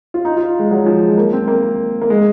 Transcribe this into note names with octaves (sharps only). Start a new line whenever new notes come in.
F4
D#4
F4
G#3
F#3
F3
G#3
A#3
C4
A#3
A#3
G#3